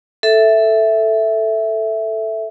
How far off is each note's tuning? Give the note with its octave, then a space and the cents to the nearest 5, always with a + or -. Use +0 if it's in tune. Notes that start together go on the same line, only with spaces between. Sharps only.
A4 +0 E5 +0